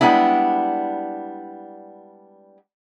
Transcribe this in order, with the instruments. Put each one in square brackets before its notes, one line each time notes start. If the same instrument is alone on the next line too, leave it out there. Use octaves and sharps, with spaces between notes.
[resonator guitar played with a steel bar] G3 G#3 B3 D4 E4